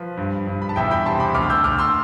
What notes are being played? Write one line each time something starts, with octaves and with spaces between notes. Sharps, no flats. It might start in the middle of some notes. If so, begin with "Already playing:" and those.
Already playing: F3 B4
G2
G2
B5
A5
E2 E5 G5
G5 B5
C3 A5 C6
B5 D6
D2 D6 F6
E6 G6
D2 D6 F6
C6 E6